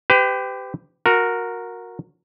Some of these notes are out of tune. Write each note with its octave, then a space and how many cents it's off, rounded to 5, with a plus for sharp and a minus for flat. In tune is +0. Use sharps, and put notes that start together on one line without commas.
G4 +0 B4 +40
F#4 -20 A#4 -5